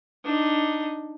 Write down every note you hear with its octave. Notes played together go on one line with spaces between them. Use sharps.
D4 D#4